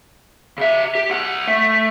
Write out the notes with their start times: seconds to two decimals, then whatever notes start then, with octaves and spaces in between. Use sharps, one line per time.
0.58 C#3 E5
0.95 G4
1.10 C2 F#5
1.47 A3